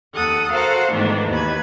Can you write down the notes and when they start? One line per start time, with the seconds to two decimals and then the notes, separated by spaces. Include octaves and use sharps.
0.14 D#2 A4 F#5 D#6
0.51 F#4 A4 A#4 C5 F5 F#5
0.91 G#2 B2 D#3 E3 A3 D4
1.30 D#2 B4 G#6